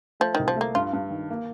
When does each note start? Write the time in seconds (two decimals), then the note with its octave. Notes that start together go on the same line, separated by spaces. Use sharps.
0.20 F3 A3
0.35 C2 D#3
0.48 F3
0.56 A3 A#3
0.75 G2 F4
0.93 G2
1.11 D#3
1.30 A#3